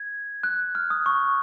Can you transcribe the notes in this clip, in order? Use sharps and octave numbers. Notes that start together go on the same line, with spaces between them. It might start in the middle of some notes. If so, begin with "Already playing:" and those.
Already playing: G#6
F#6
F6
D#6
C#6